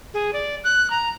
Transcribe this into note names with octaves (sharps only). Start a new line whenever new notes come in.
G#4
D5
F#6
A#5